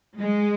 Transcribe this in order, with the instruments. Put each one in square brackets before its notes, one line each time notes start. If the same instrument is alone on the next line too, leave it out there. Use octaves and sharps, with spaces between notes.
[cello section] G#3